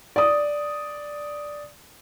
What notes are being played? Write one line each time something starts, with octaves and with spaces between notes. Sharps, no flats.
D5 D#6